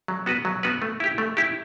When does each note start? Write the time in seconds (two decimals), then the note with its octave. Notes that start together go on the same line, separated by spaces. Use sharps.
0.08 F#3
0.26 B3 F#4 B4
0.45 F#3
0.63 B3 F#4 B4
0.82 A3
1.00 E4 G4
1.18 A3
1.37 E4 G4